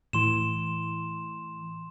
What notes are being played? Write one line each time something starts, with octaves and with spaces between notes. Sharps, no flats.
A2 E3 C6 E7